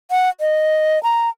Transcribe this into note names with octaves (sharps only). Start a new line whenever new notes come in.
F#5
D#5
A#5